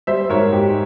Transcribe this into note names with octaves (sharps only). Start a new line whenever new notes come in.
G3 C5 E5
G#2 A#4 C#5
G#2 G4